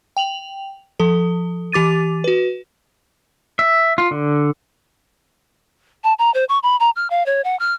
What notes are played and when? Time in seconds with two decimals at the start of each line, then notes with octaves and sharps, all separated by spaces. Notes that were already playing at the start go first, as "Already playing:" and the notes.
0.17 G5 F7 F#7
1.00 F3 A4
1.72 E3 G4 D6 A6 D#7
2.24 F#4 B4
3.59 E5
3.98 F4
4.11 D3
6.04 A5
6.19 A#5
6.34 C5
6.49 C#6
6.63 B5
6.80 A#5
6.96 F6
7.10 F5
7.26 C#5
7.44 F#5
7.59 F6